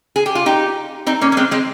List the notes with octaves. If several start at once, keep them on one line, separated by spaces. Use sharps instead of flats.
G#4
G4
F4
D#4 G4
C4 D#4
A#3 C#4
C#4
G#3 C4
G#3 C4